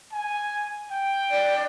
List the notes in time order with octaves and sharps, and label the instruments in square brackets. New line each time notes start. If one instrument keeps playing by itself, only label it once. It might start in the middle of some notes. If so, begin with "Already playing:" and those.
[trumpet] G#5
G5
[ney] D5